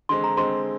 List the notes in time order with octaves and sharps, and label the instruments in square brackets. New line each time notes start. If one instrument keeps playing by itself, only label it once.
[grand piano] D3 G#3 C4 [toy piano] C6
[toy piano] A#5
[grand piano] D3 G#3 C4 [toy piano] C6